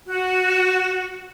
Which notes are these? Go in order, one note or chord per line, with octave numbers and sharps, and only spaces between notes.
F#4